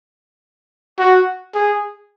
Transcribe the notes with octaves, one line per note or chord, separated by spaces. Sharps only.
F#4
G#4